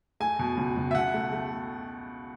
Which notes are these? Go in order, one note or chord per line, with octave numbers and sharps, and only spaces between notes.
A3 G#5
B2
C#2
C#2
E5
B2 F#5
A3
A3